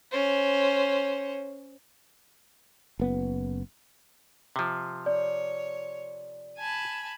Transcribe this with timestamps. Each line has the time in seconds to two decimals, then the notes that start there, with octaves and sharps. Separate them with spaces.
0.11 C#4 C5
3.00 F#1 B3
4.56 C3 F3
5.06 C#5 D5
6.58 G#5 A5 B5